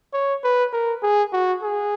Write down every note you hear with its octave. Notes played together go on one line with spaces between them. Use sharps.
C#5
B4
A#4
G#4
F#4
G#4